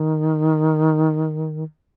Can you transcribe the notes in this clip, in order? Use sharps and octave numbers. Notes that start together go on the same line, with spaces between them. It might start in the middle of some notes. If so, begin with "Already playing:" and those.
Already playing: D#3